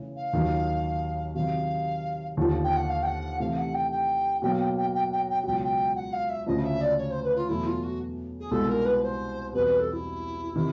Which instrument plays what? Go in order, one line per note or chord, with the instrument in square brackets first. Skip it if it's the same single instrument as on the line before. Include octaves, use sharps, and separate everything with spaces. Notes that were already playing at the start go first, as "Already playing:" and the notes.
Already playing: [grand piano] C#3 E3 A3
[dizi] F5
[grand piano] D#2 D#3 F#3
[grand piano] C3 D#3 F#3 [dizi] F5
[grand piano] D#2 D3 F3
[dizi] G5
F#5
F5
G5
F#5
[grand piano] C3 E3 A3 [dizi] F5
[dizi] F#5
G5
G5
[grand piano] B2 F#3 A#3 [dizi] G5
[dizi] G5
G5
G5
G5
G5
[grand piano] C#2 B2 F#3 [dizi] G5
[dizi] G5
F#5
F5
E5
[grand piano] D2 C#3 F3 [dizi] D#5
[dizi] E5
D5
C#5
C5
B4
F4
[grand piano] E2 B2 F#3 A3 [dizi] E4
[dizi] F4
F#4
G#4
[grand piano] C2 B2 G#3 [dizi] A4
[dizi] A#4
B4
B4
C5
[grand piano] E2 B2 G3 C4 [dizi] B4
[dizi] B4
A4
E4
[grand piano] C3 D#3